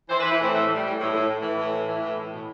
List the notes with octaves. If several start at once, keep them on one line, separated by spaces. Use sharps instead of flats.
E3 C5
B4
E3
E4
A2 C4
E3 A3
E3
G3
A2
A2
A2
A2
E3
A2
E3
E3
A2
A2
B2